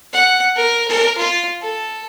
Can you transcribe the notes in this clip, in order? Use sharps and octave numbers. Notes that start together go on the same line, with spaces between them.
F#5
A#4
A#4
F4
A4